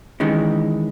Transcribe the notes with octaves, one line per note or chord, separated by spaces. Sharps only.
D#3 E3 G#3 C#4